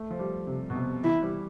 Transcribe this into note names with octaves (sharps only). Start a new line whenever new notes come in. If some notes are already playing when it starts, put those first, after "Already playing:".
Already playing: A3
F3
G3
C3
B2
C3
E3 E4
G3